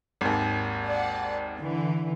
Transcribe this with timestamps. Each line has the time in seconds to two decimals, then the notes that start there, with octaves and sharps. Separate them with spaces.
0.21 G#1 D#2
0.85 D5 F#5
1.60 D3 E3